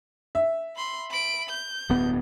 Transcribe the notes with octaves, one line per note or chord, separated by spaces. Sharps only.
E5
B5 C6
B5 D7
G6
D1 G2 B3